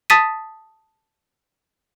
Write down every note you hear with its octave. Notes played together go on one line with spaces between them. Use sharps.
A5 D#6 A6 B6 D#7